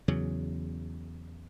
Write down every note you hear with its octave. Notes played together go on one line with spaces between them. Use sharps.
E2 C#3 F#3